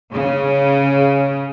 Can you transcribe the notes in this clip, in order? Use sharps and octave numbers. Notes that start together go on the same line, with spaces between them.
C#3